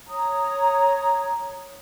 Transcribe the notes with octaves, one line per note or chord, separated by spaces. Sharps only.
C#5 A#5 D#6